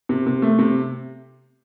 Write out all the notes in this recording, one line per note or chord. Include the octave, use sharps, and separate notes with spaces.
C3
C3
A3
C3